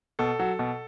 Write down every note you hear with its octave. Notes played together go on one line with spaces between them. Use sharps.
B2 A4
F#3
B2